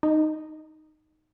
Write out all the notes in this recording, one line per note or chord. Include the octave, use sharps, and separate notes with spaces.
D#4